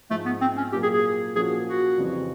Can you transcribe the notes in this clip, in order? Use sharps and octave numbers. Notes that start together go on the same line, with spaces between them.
G#2 F3 G#3 A3
B3
C4
C#4
A#2 F#3 A#3 G4
G#4
G#4
A#2 F3 A#3 C#4 F#4 G#4
F#4
F2 C#3 E3 G3 C4